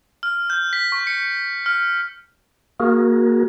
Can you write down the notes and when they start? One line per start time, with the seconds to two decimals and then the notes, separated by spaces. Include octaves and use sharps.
0.23 F6
0.50 G6
0.73 B6
0.92 C#6
1.07 C#7
1.66 F6
2.80 A#3 F#4 G#4 A#4